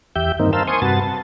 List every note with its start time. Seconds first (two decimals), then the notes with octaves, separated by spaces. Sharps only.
0.16 E2 G4 E5 G6
0.40 G2 D#3 A#3 C4 D#4
0.53 A#4 C5 F5 A5 E6
0.67 C5 G#5 C6 C#6 D#6
0.82 G2 C3 F#4 B4 A5 A6
1.00 A5